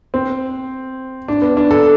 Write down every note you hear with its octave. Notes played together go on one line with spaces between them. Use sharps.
C4
D4
B3
D4
A4